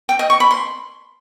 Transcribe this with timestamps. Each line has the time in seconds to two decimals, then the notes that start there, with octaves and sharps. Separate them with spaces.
0.09 G5
0.19 D#5
0.30 C#6
0.40 B5
0.51 C6